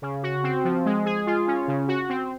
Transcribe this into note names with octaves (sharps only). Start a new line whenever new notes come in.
C#3
F#4
C4
F3
G#3
G#4
F4
C#4
C#3
F#4
C4